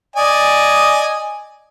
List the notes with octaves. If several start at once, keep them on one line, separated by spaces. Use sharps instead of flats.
D5 D#5 G#5